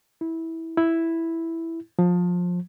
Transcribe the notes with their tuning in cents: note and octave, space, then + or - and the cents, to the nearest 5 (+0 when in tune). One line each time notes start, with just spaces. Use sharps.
E4 -15
E4 +0
F3 +25